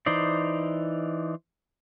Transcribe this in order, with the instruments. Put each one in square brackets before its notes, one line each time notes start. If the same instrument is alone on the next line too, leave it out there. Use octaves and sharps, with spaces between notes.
[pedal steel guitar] E3 D#4 C5 D5